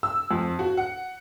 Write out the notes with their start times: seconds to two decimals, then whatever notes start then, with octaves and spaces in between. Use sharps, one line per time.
0.03 E6
0.31 F2
0.59 F#4
0.77 F#5